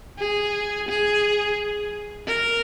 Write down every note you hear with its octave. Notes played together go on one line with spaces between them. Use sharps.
G#4
G#4
A#4